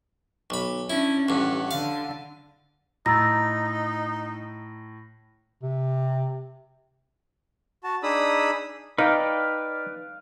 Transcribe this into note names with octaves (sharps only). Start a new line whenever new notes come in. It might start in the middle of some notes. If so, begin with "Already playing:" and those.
B1 B5
C#4 D4 E4
A1 G2 F#5
D3 F5
A2 D#4 A#5 E6 A6 A#6
C3
F#4 A5
D4 D#4 G#4 B5 D#6 E6
D#4 B4 D5 F5 G5